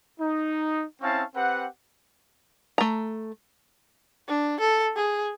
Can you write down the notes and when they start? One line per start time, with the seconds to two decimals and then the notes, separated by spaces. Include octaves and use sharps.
0.20 D#4
1.02 C4 C#4 E4 F5 A5 C#6
1.35 C4 G4 B4 F#5
2.78 A3 A#5
4.28 D4
4.61 A4
4.96 G#4